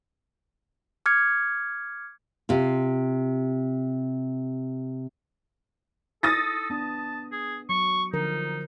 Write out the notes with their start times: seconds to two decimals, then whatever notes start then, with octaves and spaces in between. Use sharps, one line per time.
1.06 D6 F6 G#6 C#7
2.49 C3 F4
6.23 A4 D#6 A6 A#6
6.70 B3 D4 A5
7.32 G#4
7.69 F#3 C#6
8.13 D3 F3 D#4 A#4